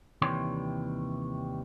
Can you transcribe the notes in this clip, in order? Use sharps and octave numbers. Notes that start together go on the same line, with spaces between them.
D#2 C3 E3 G3 C#5 C6